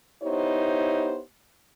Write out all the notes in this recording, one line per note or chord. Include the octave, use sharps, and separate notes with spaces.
B3 D#4 E4 G4 C5 C#5